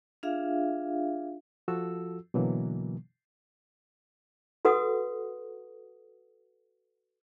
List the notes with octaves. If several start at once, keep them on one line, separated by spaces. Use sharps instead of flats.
D4 F4 G#4 E5 F5
F3 F4 F#4 A4 E6
B2 D3 E3 F#3 A#3
F#4 A4 B4 F#5 D#6